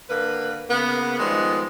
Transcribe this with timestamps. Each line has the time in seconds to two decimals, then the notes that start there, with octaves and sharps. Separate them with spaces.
0.10 D3 A#3 B4
0.70 C#3 A#3 B3
1.20 D#3 F3 G3 G#3 B3